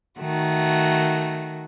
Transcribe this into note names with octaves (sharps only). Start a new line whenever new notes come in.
D#3 A3 F#4